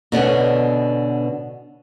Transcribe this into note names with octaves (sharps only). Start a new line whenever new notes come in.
B2 D3 B3 C#4